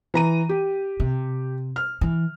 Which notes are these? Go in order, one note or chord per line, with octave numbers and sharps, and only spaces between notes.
E3 A#5 D#7
G4
C3
F6
E3